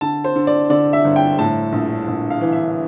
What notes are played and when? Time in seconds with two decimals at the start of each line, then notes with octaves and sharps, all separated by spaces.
0.01 D3 A5
0.24 C5
0.36 D3
0.47 D5
0.70 D3 D5
0.93 E5
1.04 G1
1.16 G5
1.39 A2 A5
1.72 A#1
2.07 A#1
2.30 F5
2.41 E3
2.52 E5